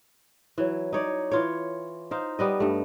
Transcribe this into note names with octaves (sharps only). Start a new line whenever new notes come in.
E3 F#3
D#4 C#5 D5
E3 F4 C#5
D#4 C5 F5
G3 B3 D#5
G2 A3